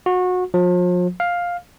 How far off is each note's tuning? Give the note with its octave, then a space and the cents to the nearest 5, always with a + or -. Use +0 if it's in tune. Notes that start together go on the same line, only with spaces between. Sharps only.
F#4 -25
F3 +40
F5 +10